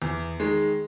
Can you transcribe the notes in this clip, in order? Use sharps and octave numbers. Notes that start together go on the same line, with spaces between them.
E2
D#3 G#3